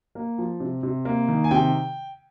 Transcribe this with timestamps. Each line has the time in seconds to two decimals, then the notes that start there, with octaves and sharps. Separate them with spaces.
0.15 A#3
0.38 F3
0.60 C3
0.83 C3
1.05 A#3
1.28 D#3
1.44 G#5
1.51 C3 G5